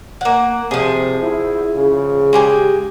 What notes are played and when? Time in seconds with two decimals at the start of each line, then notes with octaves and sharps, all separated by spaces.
0.21 A#3 F#5
0.71 C3 F3 G#4
1.22 E4
1.75 C#3
2.33 G#3 G4 G#5